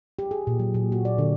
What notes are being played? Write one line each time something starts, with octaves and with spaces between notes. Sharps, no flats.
G4
G#4
A#2
F#3
A#2
F#4
D5
D3